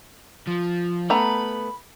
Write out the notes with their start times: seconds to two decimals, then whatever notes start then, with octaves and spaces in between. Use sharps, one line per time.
0.47 F3
1.10 A3 B3 A#5 B5